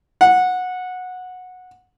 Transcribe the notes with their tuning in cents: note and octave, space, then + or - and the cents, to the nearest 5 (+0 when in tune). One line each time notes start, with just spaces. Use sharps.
F#5 -15